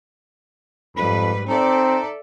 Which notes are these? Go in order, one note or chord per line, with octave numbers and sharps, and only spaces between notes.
F2 G#2 G3 B4 B5
C4 D#4 A4 D5 E5